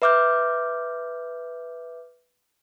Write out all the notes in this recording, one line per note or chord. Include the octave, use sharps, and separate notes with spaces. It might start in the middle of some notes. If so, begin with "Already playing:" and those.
B4 E5 D6 F6 G6